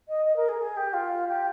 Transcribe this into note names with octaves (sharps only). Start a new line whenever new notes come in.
D#5
D#5
A#4
G#4
G#4
G4
F4
G4